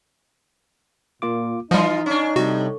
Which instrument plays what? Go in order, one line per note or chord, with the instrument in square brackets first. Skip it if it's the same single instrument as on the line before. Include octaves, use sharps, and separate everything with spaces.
[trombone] A#2 [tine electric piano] A#3 F4 D6
[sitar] E3 F4 [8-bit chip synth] F3 G3 [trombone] D#4 [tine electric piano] D#5
[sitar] C#4 D4
[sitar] A2 [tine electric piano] C3 G3 [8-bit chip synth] F#4